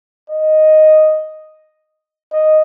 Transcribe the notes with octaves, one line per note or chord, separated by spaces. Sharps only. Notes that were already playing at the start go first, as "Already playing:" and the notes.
D#5
D#5